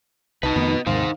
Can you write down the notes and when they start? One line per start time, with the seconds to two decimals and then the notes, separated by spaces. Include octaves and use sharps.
0.43 C2 D#4 B4 D#5 A5
0.56 F2 D#3 A3 B3
0.86 D#2 G#2 C3 D#3 D#4 C5 F5